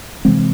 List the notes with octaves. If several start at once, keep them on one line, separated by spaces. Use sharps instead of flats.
C3 E3 G#3 C4